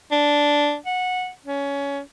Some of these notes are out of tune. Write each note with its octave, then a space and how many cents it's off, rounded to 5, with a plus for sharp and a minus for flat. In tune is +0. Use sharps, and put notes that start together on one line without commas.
D4 -5
F#5 -15
C#4 +20